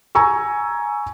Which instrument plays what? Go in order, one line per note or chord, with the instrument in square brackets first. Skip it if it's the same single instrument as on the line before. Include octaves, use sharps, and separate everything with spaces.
[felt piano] G#5 A#5 C#6 E6